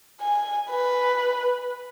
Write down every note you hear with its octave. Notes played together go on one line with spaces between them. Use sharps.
G#5
B4